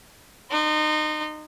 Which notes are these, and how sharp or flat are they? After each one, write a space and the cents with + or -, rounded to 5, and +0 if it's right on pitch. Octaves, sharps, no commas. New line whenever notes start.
D#4 -30 C6 -25